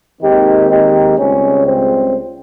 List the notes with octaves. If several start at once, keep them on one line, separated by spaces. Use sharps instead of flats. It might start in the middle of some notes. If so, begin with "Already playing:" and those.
D#2 D#3 G#3 C4 D#4 G4
D#4 G4
C#2 C#3 G3 C4 C#4
C4